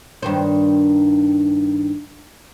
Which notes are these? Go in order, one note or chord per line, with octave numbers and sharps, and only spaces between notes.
G2 D#3 C5